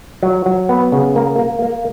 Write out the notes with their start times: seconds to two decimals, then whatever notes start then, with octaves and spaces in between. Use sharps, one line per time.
0.23 F#3
0.46 F#3
0.69 B3
0.92 C#3
1.16 A#3
1.39 A#3
1.62 A#3